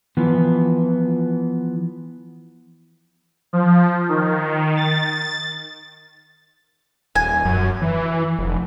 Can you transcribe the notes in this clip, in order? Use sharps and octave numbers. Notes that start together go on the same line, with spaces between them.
E3 F3 B3
F3
D#3
A6
D#1 G#5
F#2
E3
F1